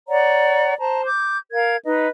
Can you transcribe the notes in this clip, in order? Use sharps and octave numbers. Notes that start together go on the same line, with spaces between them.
C#5 D5 F#5 A#5
C5 A5 A#5
D6 G6
A#4 F5 G#6
D#4 B4 D#5